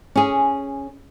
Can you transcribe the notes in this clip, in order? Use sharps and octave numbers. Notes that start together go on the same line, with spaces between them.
C#4 G#4